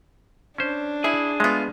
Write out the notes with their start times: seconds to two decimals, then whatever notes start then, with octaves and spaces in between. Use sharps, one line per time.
0.58 C#4 D4 C5
1.04 E4 G#4 G#5
1.40 G#3 A3 B3 F4